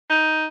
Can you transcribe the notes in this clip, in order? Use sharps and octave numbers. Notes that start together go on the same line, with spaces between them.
D#4